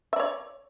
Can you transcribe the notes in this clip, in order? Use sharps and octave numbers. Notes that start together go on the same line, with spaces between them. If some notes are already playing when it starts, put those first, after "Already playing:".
C#5 D5 E5